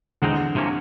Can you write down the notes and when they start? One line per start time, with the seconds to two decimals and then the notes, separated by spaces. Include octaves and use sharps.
0.22 E2 B2 D3 G#3 C4 D#4
0.55 C2 C3 F3 A#3 C#4